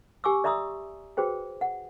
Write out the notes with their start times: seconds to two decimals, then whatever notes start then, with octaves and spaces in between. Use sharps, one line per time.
0.24 G4 G#5 C#6 D6 E6
0.44 D5 E5 A#5 C6 D#6 E6
1.17 F#4 G#4 B4 C5 G5
1.61 F#5